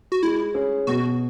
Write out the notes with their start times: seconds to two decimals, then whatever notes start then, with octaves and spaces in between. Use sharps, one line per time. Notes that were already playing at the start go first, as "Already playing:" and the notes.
0.12 F#4
0.23 G#3 E4
0.54 C#4 G#4
0.87 B2 F#4